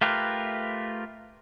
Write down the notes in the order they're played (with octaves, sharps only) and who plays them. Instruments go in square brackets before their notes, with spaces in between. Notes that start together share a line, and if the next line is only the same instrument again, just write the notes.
[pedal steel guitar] A3 F4 G4 A#4 B4